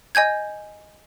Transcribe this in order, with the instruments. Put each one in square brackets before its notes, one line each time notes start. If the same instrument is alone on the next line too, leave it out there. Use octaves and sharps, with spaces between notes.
[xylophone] D#5 G#5 G6 G#6